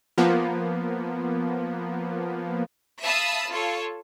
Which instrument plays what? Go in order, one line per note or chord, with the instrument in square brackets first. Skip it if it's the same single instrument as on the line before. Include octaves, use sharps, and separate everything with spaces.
[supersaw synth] F3 A#3 B3
[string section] E5 F5 A5 B5 D#6 E6
F4 A4 C#5